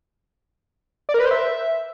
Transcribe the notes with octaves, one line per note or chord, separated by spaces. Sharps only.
D5
A#4
B4
C5
E5